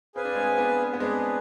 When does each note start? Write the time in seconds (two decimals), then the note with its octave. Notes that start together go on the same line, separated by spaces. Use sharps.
0.15 C4 G#4 B4 F5 G#5
0.25 D4
0.35 G#3 C4
0.52 C4
0.58 B3 D4
0.94 B3
1.00 G#3 C4 D4 G#4 B4